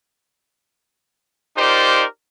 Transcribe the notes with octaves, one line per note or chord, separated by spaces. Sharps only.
D#4 F4 G4 A#4 C5 D5